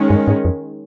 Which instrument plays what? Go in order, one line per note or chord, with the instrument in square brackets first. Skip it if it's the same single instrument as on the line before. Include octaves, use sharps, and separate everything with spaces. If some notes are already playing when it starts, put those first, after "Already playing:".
Already playing: [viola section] D#3 G#3 C#4
[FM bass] G2
G#2
F2